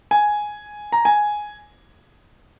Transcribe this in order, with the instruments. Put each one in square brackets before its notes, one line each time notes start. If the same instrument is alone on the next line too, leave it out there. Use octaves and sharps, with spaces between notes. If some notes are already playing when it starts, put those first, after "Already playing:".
[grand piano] G#5
A#5
G#5